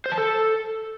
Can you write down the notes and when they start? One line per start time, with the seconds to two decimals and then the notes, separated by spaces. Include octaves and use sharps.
0.06 C5
0.12 A5
0.18 A4